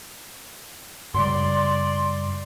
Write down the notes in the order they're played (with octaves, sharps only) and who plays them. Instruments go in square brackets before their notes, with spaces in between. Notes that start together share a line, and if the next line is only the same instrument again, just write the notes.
[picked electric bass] F#2 C#3 G3 [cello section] D5 [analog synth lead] C6